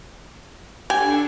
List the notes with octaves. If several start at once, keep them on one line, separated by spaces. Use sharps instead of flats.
D4 G4 A4 G#5